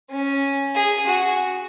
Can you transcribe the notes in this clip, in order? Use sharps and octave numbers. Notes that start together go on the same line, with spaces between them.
C#4
G#4
F#4